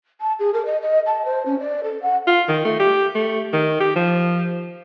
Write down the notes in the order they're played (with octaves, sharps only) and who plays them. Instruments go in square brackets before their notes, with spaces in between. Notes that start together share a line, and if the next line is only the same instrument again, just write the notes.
[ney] A5
G#4
A#4
D#5
D#5
A5
C5
C#4
D5
A4
F#5
[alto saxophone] F4
D#3
A3
G4
A3
D#3
G4
F3